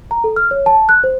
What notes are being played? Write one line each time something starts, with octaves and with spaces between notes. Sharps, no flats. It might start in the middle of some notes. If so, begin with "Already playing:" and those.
A#5
A4
F6
C#5
A5
F#6
C5